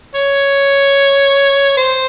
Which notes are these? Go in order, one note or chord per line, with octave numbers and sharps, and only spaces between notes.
C#5
C5